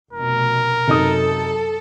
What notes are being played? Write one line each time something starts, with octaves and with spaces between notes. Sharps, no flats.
F1 B2 A#4
F#2 C3 D#4 A4 D#6